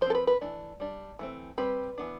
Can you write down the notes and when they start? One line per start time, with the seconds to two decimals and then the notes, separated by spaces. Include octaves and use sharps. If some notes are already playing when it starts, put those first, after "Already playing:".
0.01 F3 C5
0.06 C4 A4
0.15 B4
0.27 B4
0.41 E3 A3 D4
0.80 G3 D4
1.19 E3 A3 C4
1.58 G3 C4 B4
1.98 E3 B3 D4